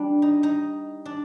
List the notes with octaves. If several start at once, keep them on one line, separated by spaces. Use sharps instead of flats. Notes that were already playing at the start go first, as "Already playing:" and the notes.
Already playing: G3 D4
D#4
D#4
D4